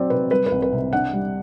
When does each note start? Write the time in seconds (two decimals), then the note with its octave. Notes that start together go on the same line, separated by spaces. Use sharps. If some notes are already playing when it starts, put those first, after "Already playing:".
Already playing: F#3 C4 D5
0.10 C3 B4
0.30 G3 B4
0.46 B4
0.52 C2
0.62 B4
0.72 C3
0.93 D4 F#5
1.13 G3